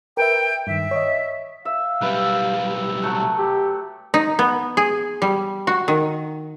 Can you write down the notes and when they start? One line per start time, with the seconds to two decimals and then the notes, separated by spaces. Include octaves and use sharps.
0.17 A#4 B4 E5 G5
0.67 G2 D#3 E5
0.91 C#5 D#5
1.65 E5 F5
2.01 B1 G3 B4 E5 G5
3.02 F#3 A3 F#5
3.38 G4
4.14 D#4
4.39 B3
4.77 G#4
5.22 G3
5.67 F#4
5.88 D#3